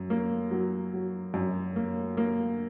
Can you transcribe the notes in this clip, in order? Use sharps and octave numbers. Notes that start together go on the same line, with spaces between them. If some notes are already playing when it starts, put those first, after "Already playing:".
Already playing: F#2
A#3
F#3
F#3
F#2
A#3
A#3